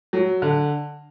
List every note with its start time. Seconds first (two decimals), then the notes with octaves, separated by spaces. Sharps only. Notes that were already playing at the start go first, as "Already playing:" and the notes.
0.13 F#3
0.42 D3